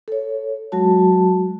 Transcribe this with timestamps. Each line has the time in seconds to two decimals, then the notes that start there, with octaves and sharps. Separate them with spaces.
0.08 A4 C#5
0.72 F#3 G#3 F#4 A5